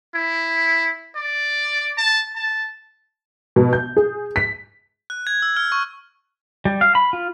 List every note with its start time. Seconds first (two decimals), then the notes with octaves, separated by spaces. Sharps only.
0.15 E4
1.16 D5
1.97 A5
2.36 A5
3.56 B2
3.73 G6
3.96 G#4
4.36 B6
5.10 F#6
5.27 G#6
5.42 E6
5.57 F6
5.72 C#6
6.65 G3
6.81 F5
6.95 B5
7.13 F4